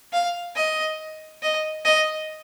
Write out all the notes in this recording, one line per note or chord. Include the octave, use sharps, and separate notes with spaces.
F5
D#5
D#5
D#5